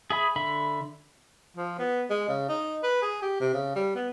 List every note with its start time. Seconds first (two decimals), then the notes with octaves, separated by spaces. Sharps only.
0.10 G#4 E5 B5
0.36 D3 E5 B5
1.57 F3
1.79 B3
2.10 G#3
2.29 C#3
2.49 D#4
2.83 B4
3.02 G#4
3.22 G4
3.41 C3
3.54 C#3
3.76 G3
3.96 B3